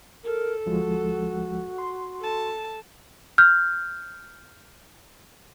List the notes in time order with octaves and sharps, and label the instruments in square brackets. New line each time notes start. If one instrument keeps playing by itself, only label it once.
[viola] A4 [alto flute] A#4
[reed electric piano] D2 F3 G#3 [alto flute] F#4
[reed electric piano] C6
[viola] A4 A5
[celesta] F6 G6